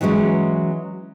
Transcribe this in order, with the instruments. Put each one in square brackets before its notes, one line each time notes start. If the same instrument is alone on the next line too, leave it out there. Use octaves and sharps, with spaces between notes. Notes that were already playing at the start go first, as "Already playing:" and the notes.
[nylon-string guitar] E3 F#3 G#3 C#4 E4